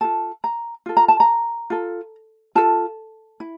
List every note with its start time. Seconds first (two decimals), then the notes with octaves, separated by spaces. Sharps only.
0.01 F4 A4 A5
0.44 A#5
0.86 F4 A4
0.97 A#5
1.08 A5
1.20 A#5
1.70 F4 A4
2.55 F4 A4 A5
3.40 E4